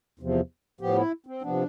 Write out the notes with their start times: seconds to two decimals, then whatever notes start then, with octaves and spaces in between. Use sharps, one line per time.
0.19 E2 C3 F3
0.81 A2 F3 B3 G4
0.96 E4
1.27 C4
1.42 C3 F3 B3 D4